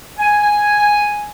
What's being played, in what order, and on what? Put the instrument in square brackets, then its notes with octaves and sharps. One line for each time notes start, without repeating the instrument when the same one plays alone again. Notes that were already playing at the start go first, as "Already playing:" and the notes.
[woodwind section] G#5